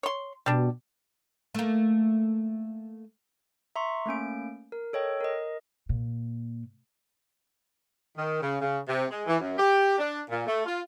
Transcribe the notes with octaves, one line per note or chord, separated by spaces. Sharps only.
C#5 C6
B2 G3 D4
A3 A#3
E5 A#5 C6 C#6
A3 A#3 C#4 D7
A#4
A4 C#5 D#5 G5
A#4 D#5
A#2
D#3
C#3
C#3
C3
G#3
E3
F#2
G4
D4
A#2
A3
F4